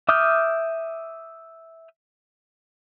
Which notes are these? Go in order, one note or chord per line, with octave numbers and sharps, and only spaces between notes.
E5 D6 D#6 F6 G6